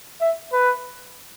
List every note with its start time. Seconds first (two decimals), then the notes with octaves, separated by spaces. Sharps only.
0.21 E5
0.53 B4